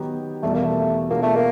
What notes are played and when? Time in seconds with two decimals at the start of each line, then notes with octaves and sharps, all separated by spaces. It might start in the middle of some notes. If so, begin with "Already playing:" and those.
Already playing: D#3 F#3 B3 D#4 G4
0.43 E2 B2 G3 A3
0.54 A#3
0.65 A3
1.10 B2 G#3 A#3 B3 D4 F4
1.23 A3
1.36 A#3